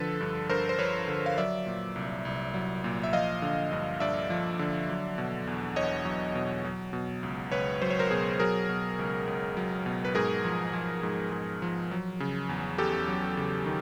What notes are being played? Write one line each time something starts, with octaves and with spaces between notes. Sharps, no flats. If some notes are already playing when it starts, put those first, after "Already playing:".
Already playing: D3 F3 A4 B4
G2
G2 A#4 C5
C5
F3 B4 C#5
D3
F5
F#3 D5 E5
A#2
C2
C2
F#3
A#2
E5
F3 D#5 F5
D3
G2
G2 D5 E5
F3
D3
F#3
B2
E2
E2 C#5 D#5
F#3
B2
F#3
B2
C#2
C#2 B4 C#5
F#3 C5
C#5
A#4 C5
B2 G#4 A#4
F#3 G#4 A#4
B2
C#2
C#2
F#3
B2
B4
G#2 G#4 A#4
F3
F3
G#2
G#2
F3
F#3
C#3
E2
E2 G4 A4
F#3
C#3
D#3